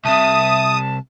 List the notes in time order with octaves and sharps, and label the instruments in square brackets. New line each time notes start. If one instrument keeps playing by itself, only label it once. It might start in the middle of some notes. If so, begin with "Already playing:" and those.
[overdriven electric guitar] C2 C3 [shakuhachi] E5 [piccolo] A5 [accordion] D#6